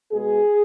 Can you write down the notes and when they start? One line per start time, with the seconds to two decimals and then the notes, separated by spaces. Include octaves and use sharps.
0.12 B2 G#3 G#4